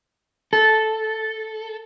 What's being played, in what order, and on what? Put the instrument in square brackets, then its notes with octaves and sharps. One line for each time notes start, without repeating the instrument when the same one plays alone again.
[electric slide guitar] A4